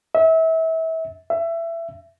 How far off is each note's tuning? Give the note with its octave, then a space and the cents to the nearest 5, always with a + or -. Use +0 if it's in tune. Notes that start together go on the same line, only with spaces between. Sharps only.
E5 -30
E5 +20